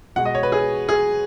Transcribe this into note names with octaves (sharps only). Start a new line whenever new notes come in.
B2 G#3 F#5
D#5
C#5
B4
G#4
G#4